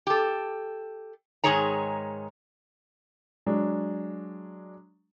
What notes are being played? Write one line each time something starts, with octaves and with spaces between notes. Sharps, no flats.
G4 A4
G#2 D#3 G#3 G#4 C#5 A#5
F#3 G#3 D4